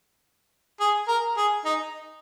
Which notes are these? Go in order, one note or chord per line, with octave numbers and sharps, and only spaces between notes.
G#4
A#4
G#4
D#4